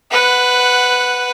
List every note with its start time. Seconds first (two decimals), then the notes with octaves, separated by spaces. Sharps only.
0.11 B4 F#5